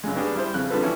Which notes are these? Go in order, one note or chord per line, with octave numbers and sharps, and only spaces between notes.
F#2 C#3 G#3
B3 C#4 D4 G4 G#4
G3 E4 C5
F2 C#3 F#6
D3 G3 B3 F4 A4 B4
E3 F3 G3 C#4 E4